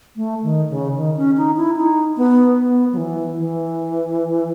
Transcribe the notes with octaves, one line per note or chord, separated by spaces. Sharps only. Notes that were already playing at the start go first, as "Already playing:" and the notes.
A3
D#3
C#3
D#3
C#4
D#4
E4
D#4
B3
B3
F#3
E3
E3